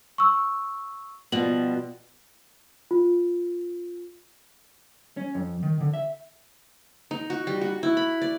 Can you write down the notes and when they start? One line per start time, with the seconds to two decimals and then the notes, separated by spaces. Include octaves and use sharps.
0.18 C#6 E6
1.32 B2 F3 G3 F#7
2.91 F4
5.17 C#4
5.35 F2
5.63 D#3
5.81 D3
5.94 E5
7.11 D#4
7.30 F#4
7.47 G3
7.61 F#4
7.83 E4
7.97 B5
8.22 D5